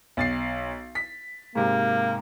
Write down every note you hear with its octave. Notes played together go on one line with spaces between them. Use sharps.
B1 A6 C7
B6
G#2 C3 A#3